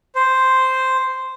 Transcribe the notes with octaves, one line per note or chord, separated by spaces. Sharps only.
C5